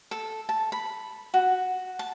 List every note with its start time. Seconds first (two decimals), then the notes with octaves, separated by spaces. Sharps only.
0.11 A4
0.49 A5
0.72 B5
1.34 F#4
1.99 A5